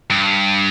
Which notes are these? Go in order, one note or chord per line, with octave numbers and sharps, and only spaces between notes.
G2